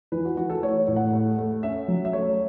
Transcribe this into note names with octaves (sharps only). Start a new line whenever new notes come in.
E3 B4
F#4
E3 F#4
A4
A3 C#5
A2
F#5
A3
A3
C#4 E5
F#3
E5
A3 C#5